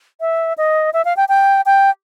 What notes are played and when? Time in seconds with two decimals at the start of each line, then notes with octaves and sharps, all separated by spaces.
0.21 E5
0.58 D#5
0.93 E5
1.05 F5
1.17 G5
1.29 G5
1.66 G5